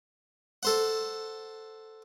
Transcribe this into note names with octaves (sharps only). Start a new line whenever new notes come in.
A4 C5 F#5